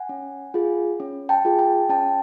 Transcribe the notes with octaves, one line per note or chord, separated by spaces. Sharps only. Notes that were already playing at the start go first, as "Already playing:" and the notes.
Already playing: F#5 G#5
C#4
F4 G#4
C#4
G5 A5
F4 G#4
G5 A5
C#4 G5 A5